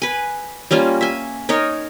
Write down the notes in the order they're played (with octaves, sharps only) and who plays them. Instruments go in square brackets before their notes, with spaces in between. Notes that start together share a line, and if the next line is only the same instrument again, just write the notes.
[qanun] B4 G#5
G3 A#3 C#4 F4
E5 G#5
D#4 A#4 C#5